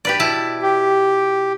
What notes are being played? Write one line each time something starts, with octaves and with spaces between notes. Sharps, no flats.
G4 B4 D5
B2 E4 A5
G4